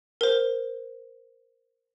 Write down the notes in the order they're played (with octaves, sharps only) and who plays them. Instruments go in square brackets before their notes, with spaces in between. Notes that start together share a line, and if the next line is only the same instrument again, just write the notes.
[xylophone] A#4 C5